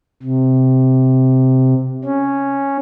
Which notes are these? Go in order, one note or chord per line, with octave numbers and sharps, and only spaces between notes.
C3
C#4